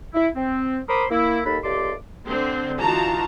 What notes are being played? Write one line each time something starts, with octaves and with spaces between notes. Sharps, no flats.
E4
C4
A#4 C5 B5 C6 D6 D#6
A#3 E4
D#2 A4 B5
C#2 A3 G4 D5 C6 D6
D3 C4
E3 D#4 F4 F#4 A5 A#5